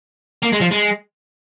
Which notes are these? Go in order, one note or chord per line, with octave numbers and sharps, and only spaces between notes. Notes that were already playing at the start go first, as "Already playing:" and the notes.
A#3
G#3
F3
G#3